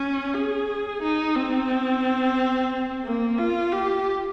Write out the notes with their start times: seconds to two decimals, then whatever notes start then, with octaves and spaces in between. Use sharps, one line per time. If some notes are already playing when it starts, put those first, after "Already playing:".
Already playing: C#4
0.34 G#4
1.03 D#4
1.36 C4
3.05 A#3
3.38 F4
3.72 G4